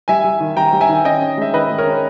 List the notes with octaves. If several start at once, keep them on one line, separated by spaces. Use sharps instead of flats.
G3 E5 G#5
G3
D#3
G3 G5 A#5
G3
E5 G#5
D#3
C#4 D#5 G5
C#4
G#3 E5
D#3 B4 D#5
G#3
A#4 C#5
C#4